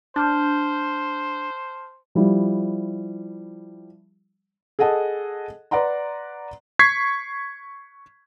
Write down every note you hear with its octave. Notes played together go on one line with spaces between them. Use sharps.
D4 C5 A5 F6 G6
F3 G3 E4
G#4 A4 D#5 F#5 A5
B4 D5 F#5 A#5 C6
C#6 G#6 B6 C7